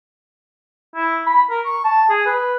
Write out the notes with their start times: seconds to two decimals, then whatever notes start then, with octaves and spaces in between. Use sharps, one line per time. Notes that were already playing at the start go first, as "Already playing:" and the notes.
0.96 E4
1.27 B5
1.50 A#4
1.65 C#6
1.84 A5
2.10 G#4
2.26 B4